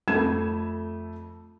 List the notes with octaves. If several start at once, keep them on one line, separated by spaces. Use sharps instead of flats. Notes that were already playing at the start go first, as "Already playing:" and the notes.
F2 A3 A4 B5 G#6 E7